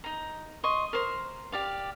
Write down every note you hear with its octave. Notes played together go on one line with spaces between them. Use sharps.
D#4 A#5
D#5 C6 C#6
A#4 C5
G4 D5 F5